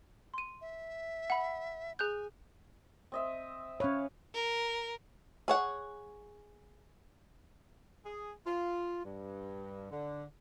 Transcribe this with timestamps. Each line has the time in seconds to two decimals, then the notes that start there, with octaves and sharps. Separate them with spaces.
0.34 C6 D#7
0.61 E5
1.30 F#5 B5
1.99 G#4 G#5 F#6 G6
3.12 C4 D#5 E5
3.80 C#4 B4 C#5 F5
4.34 A#4
5.48 G#4 C#5 F#5
8.05 G#4
8.46 F4
9.05 G2
9.91 D3